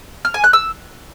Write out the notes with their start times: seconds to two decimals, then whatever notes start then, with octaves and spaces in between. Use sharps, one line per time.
0.25 F6
0.34 G#5
0.44 F#6
0.53 E6